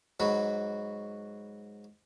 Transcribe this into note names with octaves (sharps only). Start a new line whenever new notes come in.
G#2 F#3 F#4 B5